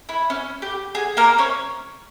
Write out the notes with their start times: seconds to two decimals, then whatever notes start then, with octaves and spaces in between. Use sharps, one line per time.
0.09 E4
0.30 C#4
0.62 G4
0.95 G#4
1.17 A#3 A#4
1.38 C#4 C#5